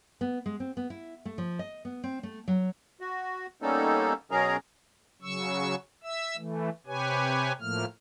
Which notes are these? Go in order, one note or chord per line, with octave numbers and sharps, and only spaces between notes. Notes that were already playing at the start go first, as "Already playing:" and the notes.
B3
G#3
C4
B3
E4
A3
F3
D#5
B3
C4
A3
F#3
F#4
G3 A#3 B3 C#4 D#4 A4
B2 F#3 C#4 G#4 A#4 A#5
C#3 F#3 C#6 E6
E5 E6
E3 A3
C3 G4 B4 C#5 G#5
A2 F3 A3 A#3 F6